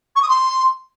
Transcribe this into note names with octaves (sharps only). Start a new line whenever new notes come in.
C#6
D#6
C6